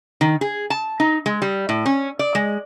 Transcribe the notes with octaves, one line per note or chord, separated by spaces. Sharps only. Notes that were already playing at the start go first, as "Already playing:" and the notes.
D#3
G#4
A5
D#4
G#3
G3
A2
C#4
D5
G#3